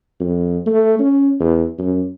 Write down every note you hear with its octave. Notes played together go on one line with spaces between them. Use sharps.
F2
A3
C#4
E2
F#2